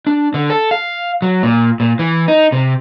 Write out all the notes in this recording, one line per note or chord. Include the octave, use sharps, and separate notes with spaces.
D4
D3
A4
F5
F#3
A#2
A#2
E3
D#4
C3